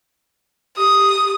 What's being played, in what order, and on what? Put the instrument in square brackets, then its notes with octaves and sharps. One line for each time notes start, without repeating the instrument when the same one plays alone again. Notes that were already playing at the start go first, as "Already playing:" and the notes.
[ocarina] G4 [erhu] D#6